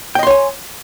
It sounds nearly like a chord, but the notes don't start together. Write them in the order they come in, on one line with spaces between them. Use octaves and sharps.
G5 D#5 C6 C#5 G#5